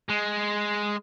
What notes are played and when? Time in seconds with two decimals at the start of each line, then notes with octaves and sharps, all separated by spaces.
0.10 G#3